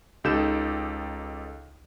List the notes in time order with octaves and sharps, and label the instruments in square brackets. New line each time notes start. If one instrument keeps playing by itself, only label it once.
[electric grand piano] C#2 D#4 G4 A4 G6 E7